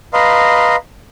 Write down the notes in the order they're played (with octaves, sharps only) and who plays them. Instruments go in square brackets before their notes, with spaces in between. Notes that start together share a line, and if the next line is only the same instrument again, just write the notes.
[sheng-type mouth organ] B4 D#5 F5 A#5 C6